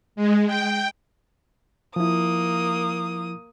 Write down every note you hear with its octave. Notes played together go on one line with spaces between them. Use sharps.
G#3
G5
F3 A#3 E4 D#6